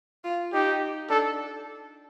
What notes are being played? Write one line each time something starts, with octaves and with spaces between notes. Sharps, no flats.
F4
D#4 G4
D4 A4